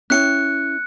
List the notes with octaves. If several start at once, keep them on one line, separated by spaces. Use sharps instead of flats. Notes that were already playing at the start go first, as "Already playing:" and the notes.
C#4 E4 G5 F#6 C#7